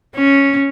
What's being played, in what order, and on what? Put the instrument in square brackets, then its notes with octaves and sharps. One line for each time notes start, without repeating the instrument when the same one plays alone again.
[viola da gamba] C#4